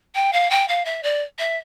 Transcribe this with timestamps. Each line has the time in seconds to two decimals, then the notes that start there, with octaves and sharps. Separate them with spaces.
0.15 G5
0.33 F5
0.50 G5
0.68 F5
0.85 E5
1.03 D5
1.39 E5